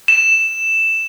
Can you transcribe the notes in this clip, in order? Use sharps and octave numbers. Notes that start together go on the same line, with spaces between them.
E7